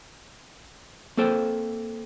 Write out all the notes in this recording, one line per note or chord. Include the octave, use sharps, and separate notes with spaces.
A#3 C4 A4 C5 G5